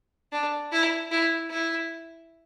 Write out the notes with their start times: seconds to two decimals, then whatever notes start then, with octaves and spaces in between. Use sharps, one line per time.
0.32 D4
0.72 E4
1.11 E4
1.50 E4